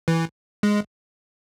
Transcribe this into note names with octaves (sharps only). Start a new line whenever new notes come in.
E3
G#3